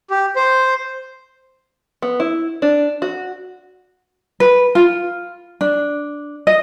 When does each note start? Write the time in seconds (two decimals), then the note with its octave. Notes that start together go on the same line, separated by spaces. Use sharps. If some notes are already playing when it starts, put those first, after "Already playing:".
0.10 G4
0.36 C5
2.02 B3
2.20 E4
2.62 D4
3.02 F#4
4.40 B4
4.75 F4
5.61 D4
6.47 D#5